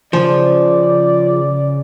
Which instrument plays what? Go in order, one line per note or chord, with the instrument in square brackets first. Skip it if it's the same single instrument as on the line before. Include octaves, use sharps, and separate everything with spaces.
[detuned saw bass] C#3 [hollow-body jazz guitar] F3 [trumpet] D5